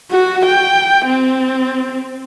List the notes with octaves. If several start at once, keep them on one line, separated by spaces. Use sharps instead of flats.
F#4
G5
C4